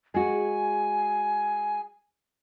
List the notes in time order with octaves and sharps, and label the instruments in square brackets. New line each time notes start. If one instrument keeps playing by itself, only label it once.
[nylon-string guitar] G#3 F#4 [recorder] G#5